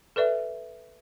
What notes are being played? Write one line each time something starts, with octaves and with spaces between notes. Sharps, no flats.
A4 B4 D5 E5